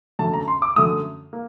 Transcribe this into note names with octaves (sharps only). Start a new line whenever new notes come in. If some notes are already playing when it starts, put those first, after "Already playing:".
F#2 D3 A3 A5
A#5
C6
D6
F#2 D3 A3 D#6
A#3